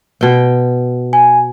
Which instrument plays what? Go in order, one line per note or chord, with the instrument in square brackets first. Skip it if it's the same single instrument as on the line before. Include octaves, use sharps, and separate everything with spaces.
[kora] B2 G5
[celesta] G#5